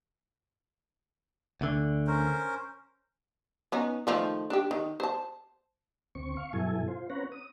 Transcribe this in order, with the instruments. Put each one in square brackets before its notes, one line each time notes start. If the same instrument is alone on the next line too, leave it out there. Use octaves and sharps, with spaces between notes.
[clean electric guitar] D2 D3
[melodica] C#4 A#4 C5
[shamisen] B3 C#4 D#4
D#3 F3 A3
D4 G4
D#3
C5 A5
[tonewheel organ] D2 C4 C#6
F5 C#6
G2 B2 F#3 E4 A4 G#5
F4 C5
C4 C#4 B4 C#5 F#5 A#5
D#6